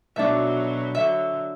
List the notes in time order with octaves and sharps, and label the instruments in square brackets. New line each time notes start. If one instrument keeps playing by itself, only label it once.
[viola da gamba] B2 F#3 [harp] D4 A4 E5
[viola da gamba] D3 F#3 [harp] E5